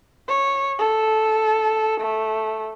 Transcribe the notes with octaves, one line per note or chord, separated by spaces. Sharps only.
C#5
A4
A3